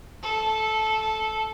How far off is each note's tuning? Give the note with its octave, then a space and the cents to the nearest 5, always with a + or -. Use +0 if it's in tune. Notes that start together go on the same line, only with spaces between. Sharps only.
A4 -10